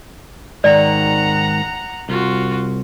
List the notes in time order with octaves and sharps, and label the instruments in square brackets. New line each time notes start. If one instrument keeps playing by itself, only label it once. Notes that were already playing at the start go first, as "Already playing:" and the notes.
[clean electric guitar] G#2 D#3 [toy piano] D5 [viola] F#5 A#5
[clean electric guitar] C2 [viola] F4 F#4